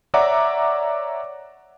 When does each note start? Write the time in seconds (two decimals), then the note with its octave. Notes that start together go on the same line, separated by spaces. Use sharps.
0.14 C#5 D5 E5 F#5 A#5 D6